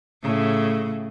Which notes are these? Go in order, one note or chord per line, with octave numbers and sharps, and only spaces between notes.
A2 C#3